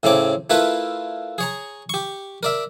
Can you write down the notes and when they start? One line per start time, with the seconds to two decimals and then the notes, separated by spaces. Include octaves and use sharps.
0.03 A2 C#3 A3 C4 D6
0.50 A3 E4 F4 A#4 B4
1.38 G#4 C#5 A#5
1.89 G4 C#6
2.43 A#4 D5 E5